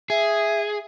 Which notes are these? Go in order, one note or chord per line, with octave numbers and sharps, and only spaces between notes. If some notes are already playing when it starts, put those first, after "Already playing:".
G#4 E5